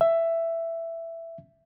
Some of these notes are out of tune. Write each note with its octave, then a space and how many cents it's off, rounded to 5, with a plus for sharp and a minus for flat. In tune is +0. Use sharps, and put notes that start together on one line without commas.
E5 +10